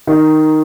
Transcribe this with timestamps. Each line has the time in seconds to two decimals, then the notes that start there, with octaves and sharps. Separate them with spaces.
0.07 D#3